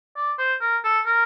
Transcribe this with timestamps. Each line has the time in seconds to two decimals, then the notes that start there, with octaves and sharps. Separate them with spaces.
0.17 D5
0.38 C5
0.61 A#4
0.84 A4
1.06 A#4